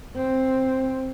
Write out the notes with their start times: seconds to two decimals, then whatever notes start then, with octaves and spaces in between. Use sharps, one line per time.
0.16 C4